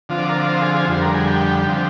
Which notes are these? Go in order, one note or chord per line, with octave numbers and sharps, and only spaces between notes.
D3 F3 C4 F4
D5
A#4
D5
C5
G#4
G#4
F2 D3 G3 C5
A#4
G#4
G4
D3 F3 C4